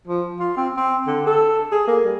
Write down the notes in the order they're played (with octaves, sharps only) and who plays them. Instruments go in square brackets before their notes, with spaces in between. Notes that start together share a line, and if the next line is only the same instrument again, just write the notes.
[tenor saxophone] F3
F4
C4
C4
D3
A4
G#4
A#3
G3